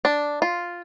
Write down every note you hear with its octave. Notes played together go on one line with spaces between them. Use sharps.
D4
F4